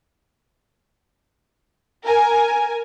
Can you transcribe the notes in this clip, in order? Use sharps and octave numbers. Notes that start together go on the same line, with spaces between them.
A#4 G#5